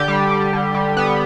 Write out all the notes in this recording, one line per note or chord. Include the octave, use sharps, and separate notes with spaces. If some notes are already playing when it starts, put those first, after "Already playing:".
Already playing: D3 G4
G3
G3
D3
G3
B3